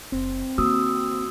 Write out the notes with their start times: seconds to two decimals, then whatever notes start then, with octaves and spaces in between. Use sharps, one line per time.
0.12 F#1 C4
0.58 D#3 A#3 F#4 D#6 E6